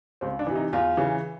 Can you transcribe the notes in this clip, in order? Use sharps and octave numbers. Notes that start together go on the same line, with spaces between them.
C#2 C4
D4
C3 E3
D#4
E2 F4
C#3 E3